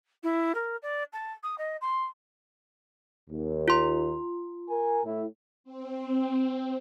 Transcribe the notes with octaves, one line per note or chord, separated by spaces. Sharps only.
E4
A#4
D5
A5
D#6
D#5
C6
D#2
F4 C6
A#4 G#5
A2 E4
C4